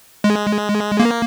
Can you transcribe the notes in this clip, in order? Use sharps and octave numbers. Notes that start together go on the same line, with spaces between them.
G#3
A#3